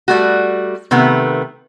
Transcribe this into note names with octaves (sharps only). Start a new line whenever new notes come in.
G3 A3 F#4
C3 D#3 A3 B3